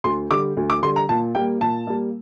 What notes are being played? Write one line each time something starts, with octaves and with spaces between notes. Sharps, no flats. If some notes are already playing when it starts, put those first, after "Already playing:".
D2 C6
D3 G3 D6
D2
D6
D3 G3 C6
A#5
A#2 A5
G3 A#3 G5
A#2 A5
G3 A#3